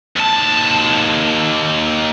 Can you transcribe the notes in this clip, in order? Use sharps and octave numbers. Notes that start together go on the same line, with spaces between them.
D#2 A5